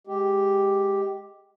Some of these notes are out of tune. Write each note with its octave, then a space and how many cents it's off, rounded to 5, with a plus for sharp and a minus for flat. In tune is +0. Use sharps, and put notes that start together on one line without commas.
G#3 +0 G4 +0